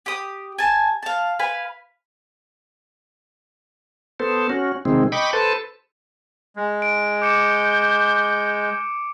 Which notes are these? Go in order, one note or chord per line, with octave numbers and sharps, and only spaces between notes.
G4 D#6
G#5 A5
F5 A5
B4 F5 G#5
B3 A4 C5
C#4 F#4
C3 D#3 G#3 C4
D#5 G5 B5 C#6 D6
A4 B4 C5 A5
G#3
D7
D6 G6 C#7 E7